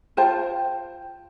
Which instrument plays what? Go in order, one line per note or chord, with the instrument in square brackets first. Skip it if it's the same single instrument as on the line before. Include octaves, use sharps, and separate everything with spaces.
[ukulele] F4 C5 G5 A5